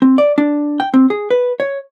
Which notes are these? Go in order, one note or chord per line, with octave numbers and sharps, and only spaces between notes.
C4
D5
D4
G5
C4
G#4
B4
C#5